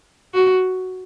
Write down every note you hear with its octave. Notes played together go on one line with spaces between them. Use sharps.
F#4